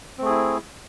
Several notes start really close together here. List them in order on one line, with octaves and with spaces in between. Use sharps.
C4 A3 G#4 E4